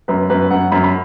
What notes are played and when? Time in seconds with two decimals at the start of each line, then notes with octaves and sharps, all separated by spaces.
0.08 F#2 B4
0.30 F#2 B4
0.51 F#2 F#5
0.72 F#2 B5
0.84 B5